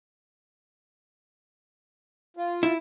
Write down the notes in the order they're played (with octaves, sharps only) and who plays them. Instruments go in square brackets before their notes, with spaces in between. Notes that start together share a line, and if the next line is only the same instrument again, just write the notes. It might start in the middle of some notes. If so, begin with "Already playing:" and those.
[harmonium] F4
[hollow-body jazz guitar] E4